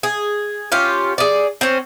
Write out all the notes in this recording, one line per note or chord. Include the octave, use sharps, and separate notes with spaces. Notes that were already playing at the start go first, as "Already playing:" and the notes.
G#4
C#4 F4 G4
G#4 D5
C4 C#4